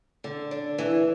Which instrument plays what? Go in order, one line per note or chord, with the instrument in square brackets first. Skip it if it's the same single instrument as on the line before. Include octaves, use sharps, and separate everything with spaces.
[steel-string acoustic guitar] D3
D4
E3